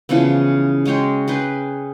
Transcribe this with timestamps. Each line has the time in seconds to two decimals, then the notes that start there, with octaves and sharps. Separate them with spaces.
0.09 C#3 E3 F3 B3
0.85 G#3 F#4 C#5 G5
1.28 G#4 B4 G5